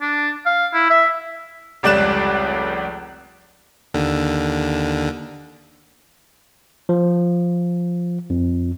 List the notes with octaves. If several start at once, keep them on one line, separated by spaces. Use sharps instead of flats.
D4
F5
E4
E5
F1 C#2 G3 D5 F#6 E7
D#2 D3
F3
F2